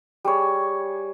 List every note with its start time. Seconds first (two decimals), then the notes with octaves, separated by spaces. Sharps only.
0.25 G3 G#4 C#5